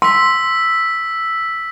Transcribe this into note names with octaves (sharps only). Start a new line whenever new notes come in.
C6 E6 B6